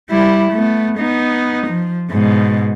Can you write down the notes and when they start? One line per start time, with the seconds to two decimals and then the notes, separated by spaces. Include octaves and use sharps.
0.10 G3 E4
0.52 A3 B3
0.98 B3 D#4
1.67 F3
2.10 G#2 B2